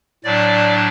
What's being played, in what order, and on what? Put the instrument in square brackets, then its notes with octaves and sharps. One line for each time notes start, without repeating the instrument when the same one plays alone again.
[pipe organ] A2 F#3 D4 D5